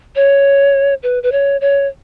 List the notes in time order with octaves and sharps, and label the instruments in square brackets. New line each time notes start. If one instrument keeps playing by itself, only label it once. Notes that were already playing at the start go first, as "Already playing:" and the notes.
[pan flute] C#5
B4
B4
C#5
C#5